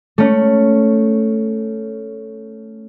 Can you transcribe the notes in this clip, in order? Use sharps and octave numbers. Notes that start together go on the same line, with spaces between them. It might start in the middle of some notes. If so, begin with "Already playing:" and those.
A3 C#4